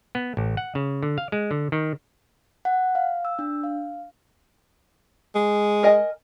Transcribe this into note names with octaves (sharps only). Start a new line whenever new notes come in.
B3
A1
F#5
C#3
D3
F5
G#3
D3
D#3
F#5
F5
E6
D4
F5
G#3
A#4 D#5 G#5